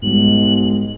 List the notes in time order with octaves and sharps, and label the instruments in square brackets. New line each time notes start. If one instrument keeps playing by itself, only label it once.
[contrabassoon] B1 [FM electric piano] G#2 G3 [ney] G#3 [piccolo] F#7